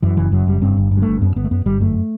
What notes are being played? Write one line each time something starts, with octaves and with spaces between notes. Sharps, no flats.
F#2 E3
F#1 E3
F#2 F#3
F#1 G3
G2 C4
G1
G2
G3
G1 A3
F#2 B3
G1 B3
A3
F#2 B3
G1 G3
F#2 A3